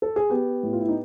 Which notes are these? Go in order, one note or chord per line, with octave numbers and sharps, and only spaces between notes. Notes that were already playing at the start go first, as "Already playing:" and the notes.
A4
G#4
B3 G4
A2
F4
E4
D#4